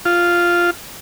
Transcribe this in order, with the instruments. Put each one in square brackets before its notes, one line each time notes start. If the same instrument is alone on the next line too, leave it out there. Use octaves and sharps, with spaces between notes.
[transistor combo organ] F4